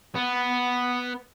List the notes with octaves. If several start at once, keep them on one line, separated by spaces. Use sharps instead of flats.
B3